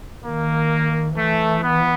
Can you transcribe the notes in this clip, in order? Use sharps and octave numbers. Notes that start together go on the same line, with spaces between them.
D#3 A#3
E3 A3
B3